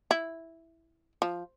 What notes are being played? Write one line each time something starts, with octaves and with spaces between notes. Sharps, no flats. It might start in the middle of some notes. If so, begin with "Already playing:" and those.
E4
F3